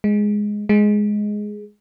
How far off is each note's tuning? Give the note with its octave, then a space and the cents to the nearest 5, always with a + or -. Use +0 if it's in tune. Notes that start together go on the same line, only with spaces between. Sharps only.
G#3 +0
G#3 +5